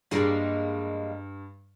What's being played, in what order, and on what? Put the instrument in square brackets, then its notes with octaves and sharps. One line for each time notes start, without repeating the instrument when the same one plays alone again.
[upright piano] G2 [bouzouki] G3 G#3 A#3